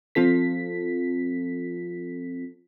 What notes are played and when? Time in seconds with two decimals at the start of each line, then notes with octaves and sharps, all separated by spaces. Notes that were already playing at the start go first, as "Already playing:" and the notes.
0.15 F3 C4 F4 A4 B6